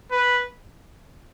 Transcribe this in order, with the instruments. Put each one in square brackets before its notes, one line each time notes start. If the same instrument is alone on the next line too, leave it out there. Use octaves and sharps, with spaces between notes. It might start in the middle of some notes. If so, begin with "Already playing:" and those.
[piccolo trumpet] B4